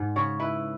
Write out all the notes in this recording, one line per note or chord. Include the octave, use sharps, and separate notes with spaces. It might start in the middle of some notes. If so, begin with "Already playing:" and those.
Already playing: G#2
C#3 C#5
E4 B4